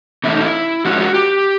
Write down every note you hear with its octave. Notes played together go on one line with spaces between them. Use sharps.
C3 E3 A3 C#4 E4
D#4
E4
F3 G#3 C#4 F#4
F#4
G4